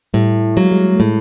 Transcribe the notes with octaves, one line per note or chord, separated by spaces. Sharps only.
A2 G3
F#3 G#3 A#3
G3
G#3
A3
A2 G#3